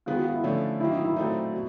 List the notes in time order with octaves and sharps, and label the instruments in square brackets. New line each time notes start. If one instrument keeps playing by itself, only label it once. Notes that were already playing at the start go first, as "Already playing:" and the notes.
[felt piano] D#3 G#3 B3 [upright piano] F4
[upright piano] F#4
F4
E4
[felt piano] D3 F3 A3 C#4
[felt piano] D#3 F#3 A#3 [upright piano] E4
[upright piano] D#4
E4
[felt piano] A#2 F#3 A3 C4 D#4
B2